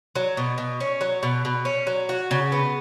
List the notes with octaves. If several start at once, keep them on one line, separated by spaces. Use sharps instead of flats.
F#3
B2
B2
C#4
F#3
B2
B2
C#4
F#3
F#4
C#3
B3